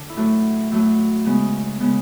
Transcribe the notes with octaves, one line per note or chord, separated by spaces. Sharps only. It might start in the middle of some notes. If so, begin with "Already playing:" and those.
Already playing: D3
E4
A2 F#3 A3 F#4
A2 F#3 A3
C#3 G#3 B3
C#3 G#3 B3